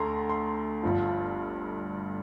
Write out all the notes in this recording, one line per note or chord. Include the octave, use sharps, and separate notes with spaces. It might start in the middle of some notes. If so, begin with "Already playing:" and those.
Already playing: D2 D3 A3 A#5 C6
C6
G1 G2 F3